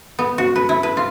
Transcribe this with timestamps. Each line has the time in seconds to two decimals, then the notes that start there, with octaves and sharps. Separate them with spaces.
0.19 B3
0.38 F#4
0.56 B4
0.69 E4
0.83 B4
0.97 F4